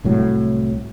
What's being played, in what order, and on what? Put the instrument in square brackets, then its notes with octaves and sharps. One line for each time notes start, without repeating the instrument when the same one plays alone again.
[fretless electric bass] C2 A2 F#3